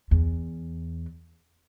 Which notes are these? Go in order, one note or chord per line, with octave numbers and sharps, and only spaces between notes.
E2